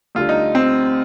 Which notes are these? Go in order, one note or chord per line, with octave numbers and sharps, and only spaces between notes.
D2 D3 G3 F4
D#4
C4